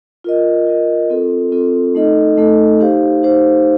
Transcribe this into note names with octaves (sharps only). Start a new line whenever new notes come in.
F4 A#4 D#5
F4 A#4 D#5
C4 F4 A4
C4 F4 A4
A3 D#4 A4 D#5
A3 D#4 A4 D#5
D#4 G4 C5 F5
D#4 G4 C5 F5